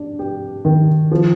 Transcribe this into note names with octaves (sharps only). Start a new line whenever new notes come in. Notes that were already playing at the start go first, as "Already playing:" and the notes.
Already playing: D4
G4
D#3
F3